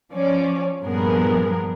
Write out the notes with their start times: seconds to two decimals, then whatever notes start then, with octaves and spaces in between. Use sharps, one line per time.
0.13 F3 C#4 D5
0.82 G2 A#2 F3 B3 G#4 A#4